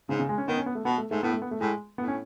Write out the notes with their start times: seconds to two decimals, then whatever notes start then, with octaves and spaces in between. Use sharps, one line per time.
0.09 G#2 C#3
0.19 C#3
0.29 G#3
0.38 C#4
0.48 D#3 B3
0.57 C#4
0.66 B3
0.75 A3
0.85 B2 B3
0.98 A3
1.11 G#2 A3
1.23 A2 B3
1.32 A3
1.42 B3
1.51 A3
1.61 A2 G#3
1.98 A2 B3
2.08 C#4